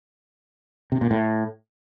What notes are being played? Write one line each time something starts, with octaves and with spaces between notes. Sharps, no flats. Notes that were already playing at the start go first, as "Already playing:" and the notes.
C3
A#2
A2